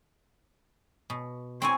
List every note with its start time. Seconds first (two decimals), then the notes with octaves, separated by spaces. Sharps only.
1.10 B2
1.62 C4 E4 G#5 C#6